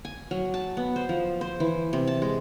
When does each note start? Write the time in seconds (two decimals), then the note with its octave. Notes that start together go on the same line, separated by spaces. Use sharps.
0.05 G#5
0.31 F#3
0.54 A5
0.77 B3
0.96 C5
1.09 F3
1.41 C5
1.60 E3
1.93 C3
2.07 A5
2.22 G#3